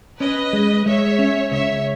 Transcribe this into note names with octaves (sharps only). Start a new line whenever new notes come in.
C#4 B4 D#5
G#3
G#3 C#5 E5
C#4
C#2 C#5 E5